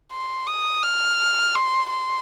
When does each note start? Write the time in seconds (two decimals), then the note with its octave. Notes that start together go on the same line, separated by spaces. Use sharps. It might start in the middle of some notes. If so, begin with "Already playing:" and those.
0.12 C6
0.47 D#6
0.83 F6
1.55 C6
1.90 C6